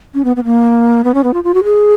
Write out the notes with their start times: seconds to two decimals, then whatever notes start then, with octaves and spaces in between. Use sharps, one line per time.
0.14 C#4
0.24 B3
0.36 B3
0.44 A#3
1.04 B3
1.14 C#4
1.24 B3
1.34 F4
1.44 F4
1.54 F#4
1.64 G#4